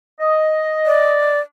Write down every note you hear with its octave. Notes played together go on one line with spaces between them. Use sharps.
D#5
D5